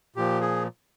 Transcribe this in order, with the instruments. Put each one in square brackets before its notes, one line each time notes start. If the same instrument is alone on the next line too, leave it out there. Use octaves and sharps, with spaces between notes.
[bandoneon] A#2 F3 G4
G#4